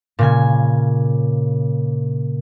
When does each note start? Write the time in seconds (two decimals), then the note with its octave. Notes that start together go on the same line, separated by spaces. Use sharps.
0.19 A#2 C#3 G#5